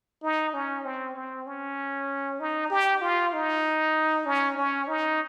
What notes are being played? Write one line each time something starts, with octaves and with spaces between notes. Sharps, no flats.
D#4
C#4
C4
C4
C#4
D#4
G4
F4
D#4
C#4
C#4
D#4